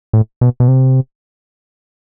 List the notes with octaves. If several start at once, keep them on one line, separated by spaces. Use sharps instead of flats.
A2
B2
B2
C3